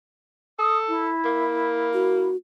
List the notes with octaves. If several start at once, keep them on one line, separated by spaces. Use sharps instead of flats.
A4 D#6
E4
A#3
F#4